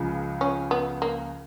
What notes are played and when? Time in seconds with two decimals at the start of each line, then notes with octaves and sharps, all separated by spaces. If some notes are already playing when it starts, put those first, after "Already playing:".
Already playing: C#2 C#3 F3
0.41 C#4
0.71 B3
1.02 A#3